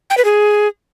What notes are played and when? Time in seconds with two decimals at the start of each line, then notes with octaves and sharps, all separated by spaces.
0.10 G5
0.17 B4
0.25 G#4